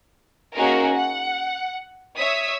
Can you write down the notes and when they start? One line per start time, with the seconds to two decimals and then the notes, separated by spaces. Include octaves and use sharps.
0.55 A#3 C#4 D#4 F#4 G#4 A#4
0.96 F#5
2.17 C#5 E5 D#6 E6 B6